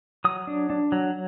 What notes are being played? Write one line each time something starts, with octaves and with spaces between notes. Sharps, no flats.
F#3 D#6
D4
D4
F#3